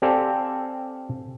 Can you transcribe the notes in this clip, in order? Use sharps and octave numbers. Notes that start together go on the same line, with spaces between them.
C4 G4 A4 D5 F5 G#5